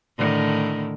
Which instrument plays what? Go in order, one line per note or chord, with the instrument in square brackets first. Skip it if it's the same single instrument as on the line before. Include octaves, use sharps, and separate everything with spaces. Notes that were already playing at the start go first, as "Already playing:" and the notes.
[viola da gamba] A2 D3 D#3